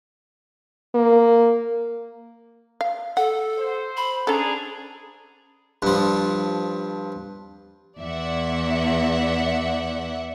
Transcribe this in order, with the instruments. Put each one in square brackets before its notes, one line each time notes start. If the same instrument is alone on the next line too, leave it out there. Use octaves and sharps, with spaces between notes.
[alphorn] A#3
[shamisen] F5
[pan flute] A4 [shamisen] F#5
[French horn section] C5
[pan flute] B5
[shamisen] C#4 A4 [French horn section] D4 G#4 [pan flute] A#5
[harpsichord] G2 F3
[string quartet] E2 [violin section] D5 E5 F#5